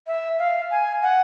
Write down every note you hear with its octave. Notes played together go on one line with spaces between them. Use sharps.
E5
F5
G#5
F#5